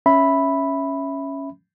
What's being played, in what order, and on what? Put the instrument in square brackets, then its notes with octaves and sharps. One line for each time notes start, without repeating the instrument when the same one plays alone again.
[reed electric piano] C#4 E5 B5